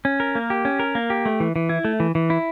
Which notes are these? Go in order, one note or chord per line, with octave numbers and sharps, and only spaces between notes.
C#4
A#4
A#3
G4
C#4
A#4
A#3
G4
A3
E3
E3
E4
A3
E3
E3
E4